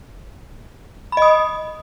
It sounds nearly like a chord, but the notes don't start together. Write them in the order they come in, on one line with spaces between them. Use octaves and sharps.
B5 D#5 D#6